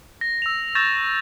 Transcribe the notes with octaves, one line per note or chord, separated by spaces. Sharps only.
A#6
E6 F7
C#6 E6 G6 A6 A#6 E7